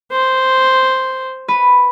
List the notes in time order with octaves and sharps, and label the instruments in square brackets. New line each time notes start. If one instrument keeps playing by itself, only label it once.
[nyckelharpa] C5
[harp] B4